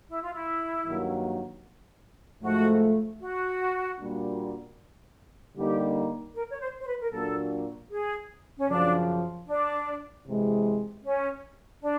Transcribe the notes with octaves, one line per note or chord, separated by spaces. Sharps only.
E4
F4
E4
G2 D#3 F#3 A#3 D4
G#2 F3 A3 F#4
F#4
A#2 G3 A#3 D4 F#4
D3 G3 A#3 D#4 G4
A#4
C#5
C5
C5
B4
A#4
A#2 F#3 A#3 D4 F#4 A4
G#4
C#4
F#2 C#3 F3 D4
D4
C3 E3 G#3
C#4
D4